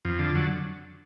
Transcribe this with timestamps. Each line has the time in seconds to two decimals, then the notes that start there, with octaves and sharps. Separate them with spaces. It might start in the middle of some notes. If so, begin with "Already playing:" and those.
0.05 F2
0.19 D3
0.35 F#3